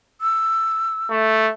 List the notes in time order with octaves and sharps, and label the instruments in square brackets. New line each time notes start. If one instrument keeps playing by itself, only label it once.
[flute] E6
[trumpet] A3